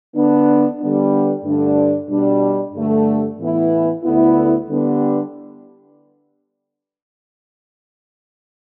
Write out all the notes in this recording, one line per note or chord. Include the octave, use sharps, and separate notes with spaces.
D3 B3 D4
D3 G3 B3 D4
G2 D3 A3 D4
B2 G3 D4
G2 D3 A3
A2 E3 B3 E4
D2 D3 B3 E4
D3 G3 B3 D4